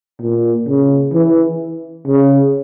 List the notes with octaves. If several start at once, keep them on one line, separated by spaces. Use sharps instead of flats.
A#2
C#3
E3
C#3